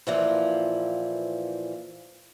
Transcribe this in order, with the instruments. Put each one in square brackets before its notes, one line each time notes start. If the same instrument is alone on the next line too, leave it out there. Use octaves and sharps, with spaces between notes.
[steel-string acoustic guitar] A#2 E3 F3